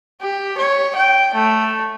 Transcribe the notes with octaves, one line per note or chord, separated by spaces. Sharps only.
G4
C#5
G5
A3